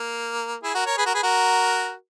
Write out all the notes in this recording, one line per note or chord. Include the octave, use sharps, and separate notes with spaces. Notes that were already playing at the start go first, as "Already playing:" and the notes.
Already playing: A#3
E4 G#4
F#4 A#4
A#4 C#5
G#4 B4
F#4 A#4
G#4 B4
F#4 A#4